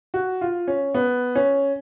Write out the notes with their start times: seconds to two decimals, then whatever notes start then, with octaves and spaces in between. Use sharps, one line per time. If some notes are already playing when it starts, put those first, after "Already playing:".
0.14 F#4
0.41 F4
0.67 C#4
0.94 B3
1.35 C#4